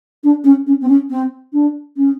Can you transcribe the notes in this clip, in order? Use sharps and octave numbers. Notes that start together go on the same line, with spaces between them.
D4
C#4
C#4
C4
C#4
C4
D4
C#4